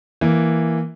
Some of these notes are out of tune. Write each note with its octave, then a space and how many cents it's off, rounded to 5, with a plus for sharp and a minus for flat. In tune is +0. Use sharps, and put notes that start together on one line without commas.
E3 +0 A#3 +0